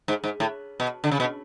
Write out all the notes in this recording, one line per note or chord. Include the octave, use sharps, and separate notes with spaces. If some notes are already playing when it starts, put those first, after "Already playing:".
G#2
G#2
A2
B2
D3
C#3
B2